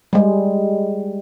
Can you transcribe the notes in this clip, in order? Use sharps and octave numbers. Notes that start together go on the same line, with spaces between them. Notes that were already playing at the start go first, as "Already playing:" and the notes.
G3 G#3